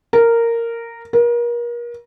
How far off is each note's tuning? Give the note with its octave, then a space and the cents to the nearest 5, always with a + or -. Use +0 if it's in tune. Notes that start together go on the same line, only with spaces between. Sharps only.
A#4 -10
A#4 +35